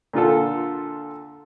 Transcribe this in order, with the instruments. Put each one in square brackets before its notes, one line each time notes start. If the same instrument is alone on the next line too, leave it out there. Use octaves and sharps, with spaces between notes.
[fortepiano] A#2 D3 F4 A4